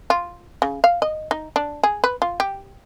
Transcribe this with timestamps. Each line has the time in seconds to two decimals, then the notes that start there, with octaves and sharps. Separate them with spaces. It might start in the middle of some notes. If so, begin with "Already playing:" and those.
0.10 F4
0.62 C#3
0.84 F5
1.02 D#5
1.31 D#4
1.56 D4
1.84 G#4
2.04 B4
2.22 F4
2.40 G4